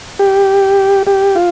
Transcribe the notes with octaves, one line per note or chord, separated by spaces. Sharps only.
G4
G4
F4